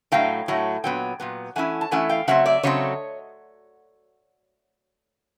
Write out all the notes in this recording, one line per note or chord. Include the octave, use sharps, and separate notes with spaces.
A2 F#3 A3 F5 G5
A2 F#3 A3
A#2 F#3 B3 G5
A#2 F#3 B3
E3 A3 C#4 E4 F#5 G#5
A5
E3 A3 C#4 E4 F#5 G#5
F5 G5
C#3 F#3 A3 C4 E5 F#5
D5 E5
C#3 F#3 A3 C4 C#5 D#5